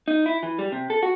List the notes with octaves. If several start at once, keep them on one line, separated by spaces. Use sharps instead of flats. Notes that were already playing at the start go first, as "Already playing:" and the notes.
D#4
E4
E3
G3
C3
A4
F#4